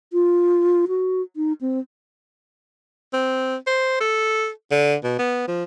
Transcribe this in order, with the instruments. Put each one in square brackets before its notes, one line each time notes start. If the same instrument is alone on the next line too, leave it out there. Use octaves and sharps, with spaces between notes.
[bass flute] F4
F#4
D#4
C4
[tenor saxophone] C4
C5
A4
D3
B2
B3
F3